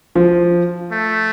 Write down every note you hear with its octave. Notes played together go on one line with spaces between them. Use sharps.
F3
A3